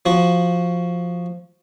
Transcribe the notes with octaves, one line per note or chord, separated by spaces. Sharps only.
F3 F#4